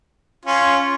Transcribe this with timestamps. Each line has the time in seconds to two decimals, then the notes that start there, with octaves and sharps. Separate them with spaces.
0.45 C#4 F4